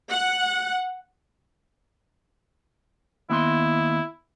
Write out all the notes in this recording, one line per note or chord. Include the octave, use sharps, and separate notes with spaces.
F#5
D#2 B3 E4 C6